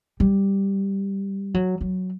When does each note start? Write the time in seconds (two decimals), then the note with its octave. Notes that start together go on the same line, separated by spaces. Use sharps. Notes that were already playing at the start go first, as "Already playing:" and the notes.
0.20 G3
1.54 F#3
1.81 F#3